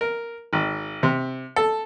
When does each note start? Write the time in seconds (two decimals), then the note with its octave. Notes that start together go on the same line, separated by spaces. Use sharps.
0.01 A#4
0.53 G#1
1.03 C3
1.56 A4